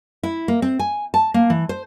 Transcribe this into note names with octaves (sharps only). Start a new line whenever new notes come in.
E4
A#3
C4
G#5
A5
A#3
E3
C5